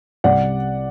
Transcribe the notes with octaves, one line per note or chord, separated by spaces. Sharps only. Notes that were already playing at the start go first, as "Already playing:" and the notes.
C2 C3 G3 D5 F#5